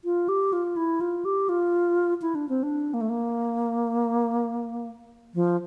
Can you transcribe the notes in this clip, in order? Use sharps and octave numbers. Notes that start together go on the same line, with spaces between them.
F4
G4
F4
E4
F4
G4
F4
E4
D4
C4
D4
A#3
A3
A#3
F3